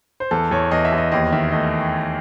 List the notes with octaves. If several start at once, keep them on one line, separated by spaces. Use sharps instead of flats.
C5
E2 A4
E2 C#5
E2 D#5
E5
E2
D#5
D#2 D#5
D#3 E5
A3 D#5